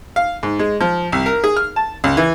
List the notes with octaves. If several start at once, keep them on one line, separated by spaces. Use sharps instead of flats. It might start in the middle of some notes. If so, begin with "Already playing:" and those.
F5
G#2
G#3
F3
C2
A#4
G#4
F6
A5
C#2
E3